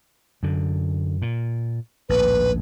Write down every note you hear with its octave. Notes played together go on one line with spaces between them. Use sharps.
F#2 D3
A#2
A#1 D#2 A2 B4